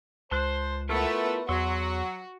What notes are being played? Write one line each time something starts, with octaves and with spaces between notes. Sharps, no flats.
C#2 C5 A5 C6 F#6
A3 B3 E4 F4 A#4 B4 E5
E2 F#3 F#4 C6 C#6 E6